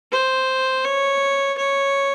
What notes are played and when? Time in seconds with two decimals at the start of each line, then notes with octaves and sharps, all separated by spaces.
0.12 C5
0.84 C#5
1.58 C#5